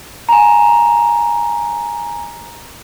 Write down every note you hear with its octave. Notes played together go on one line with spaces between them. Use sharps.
G#5 A#5